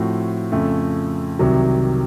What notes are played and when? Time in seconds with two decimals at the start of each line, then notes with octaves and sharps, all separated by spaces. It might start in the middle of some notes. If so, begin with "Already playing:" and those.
Already playing: A2 F3 A3 C4 F#4
0.52 F2 C#3 A3
1.39 C2 C3 D#3 F#3